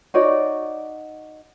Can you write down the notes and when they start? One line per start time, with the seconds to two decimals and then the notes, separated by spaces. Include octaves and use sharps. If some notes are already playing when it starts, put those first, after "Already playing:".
0.14 D#4 F#4 C#5 D5